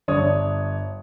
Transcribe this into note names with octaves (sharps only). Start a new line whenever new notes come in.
G1 D4 C#5 D#6